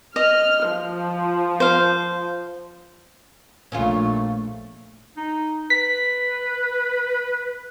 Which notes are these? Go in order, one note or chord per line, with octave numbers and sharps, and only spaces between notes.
D#5 F6
F3
C5 F5
A#1 A#2 A3 C#4 F4
D#4
B4 B6